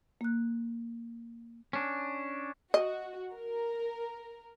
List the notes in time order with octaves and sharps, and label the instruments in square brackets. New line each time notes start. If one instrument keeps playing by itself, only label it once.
[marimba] A#3 F#6
[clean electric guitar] C#4 D4
[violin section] F#4 [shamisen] D#5
[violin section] A#4